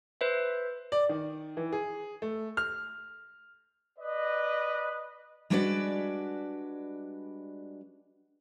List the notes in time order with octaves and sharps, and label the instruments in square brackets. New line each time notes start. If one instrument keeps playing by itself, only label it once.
[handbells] B4 C5 E5
[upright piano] D5
D#3
E3
G#4
A3
F6
[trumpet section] B4 D5 D#5
[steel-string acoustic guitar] G3 G#3 D4 F#4 B4 D5